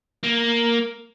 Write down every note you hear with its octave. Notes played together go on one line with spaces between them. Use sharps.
A#3